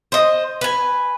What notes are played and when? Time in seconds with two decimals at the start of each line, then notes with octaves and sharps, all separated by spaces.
0.12 C5 D#5
0.61 B4 G#5